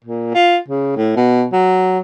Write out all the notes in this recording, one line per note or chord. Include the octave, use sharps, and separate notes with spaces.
A#2
F4
C#3
A2
B2
F#3